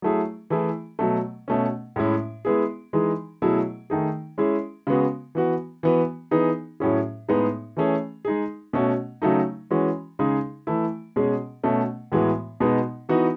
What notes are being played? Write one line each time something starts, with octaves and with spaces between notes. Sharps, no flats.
F#3 A3 E4 G#4
E3 A3 E4 G#4
B2 F#3 A3
B2 A3 C#4
A2 G#3 C#4 E4
G#3 B3 E4 G#4
E3 G#3 D#4 G#4
B2 F#3 A3 E4 G#4
D#3 A3 D#4 G#4
G#3 C#4 E4 G#4
C#3 G#3 B3 F#4
E3 B3 F#4
E3 B3 F#4
E3 B3 D#4 G#4
A2 F#3 C#4 E4 G#4
A2 G#3 B3 D#4 G#4
E3 A3 C#4 G#4
G#3 D#4 G#4
B2 A3 C#4 F#4
C#3 F#3 A3 D#4
E3 G#3 C#4 F#4
C#3 G#3 D#4 G#4
E3 A3 E4
B2 G#3 C#4 G#4
B2 A3 C#4
A2 E3 G#3 B3 F#4
B2 G#3 B3 D#4
E3 B3 D#4 F#4